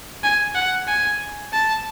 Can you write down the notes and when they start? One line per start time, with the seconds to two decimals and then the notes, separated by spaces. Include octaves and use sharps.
0.23 G#5
0.55 F#5
0.88 G#5
1.53 A5